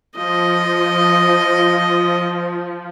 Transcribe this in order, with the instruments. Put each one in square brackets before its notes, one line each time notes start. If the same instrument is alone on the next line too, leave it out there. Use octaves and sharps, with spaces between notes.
[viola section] F3 [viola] D#5